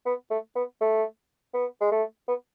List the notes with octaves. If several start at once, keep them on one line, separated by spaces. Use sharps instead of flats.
B3
A3
B3
A3
B3
G#3
A3
B3